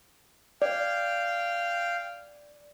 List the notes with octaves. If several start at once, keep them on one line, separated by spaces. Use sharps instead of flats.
D5 F5 G5